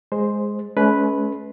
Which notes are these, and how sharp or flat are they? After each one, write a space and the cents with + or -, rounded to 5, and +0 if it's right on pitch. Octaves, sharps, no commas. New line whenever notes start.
G#3 +0 C5 +0
G#3 +45 C#4 +20 B4 +0